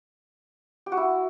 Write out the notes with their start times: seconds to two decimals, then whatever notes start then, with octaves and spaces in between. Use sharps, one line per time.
0.86 G4
0.92 F#4
0.97 E4